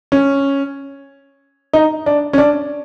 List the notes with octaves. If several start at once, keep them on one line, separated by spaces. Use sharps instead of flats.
C#4
D#4
D4
C#4
D4